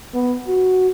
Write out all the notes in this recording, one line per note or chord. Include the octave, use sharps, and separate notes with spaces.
B3
F#4